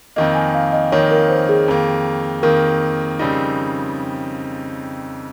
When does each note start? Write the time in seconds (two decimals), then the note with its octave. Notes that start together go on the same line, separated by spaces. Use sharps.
0.16 F2 D#3 A#3 D#5
0.35 G#5
0.54 F5
0.73 D#5
0.92 F2 D#3 A#3 C#5
1.11 A#4
1.29 C5
1.49 G#4
1.68 F2 D#3 A#3
2.43 F2 D#3 A#3 A#4
3.19 F2 C#3 G3 C4 D#4